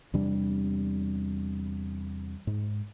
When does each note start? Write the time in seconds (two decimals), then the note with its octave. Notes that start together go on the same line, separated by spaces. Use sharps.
0.14 E2 C3 G3 D4
2.47 G#2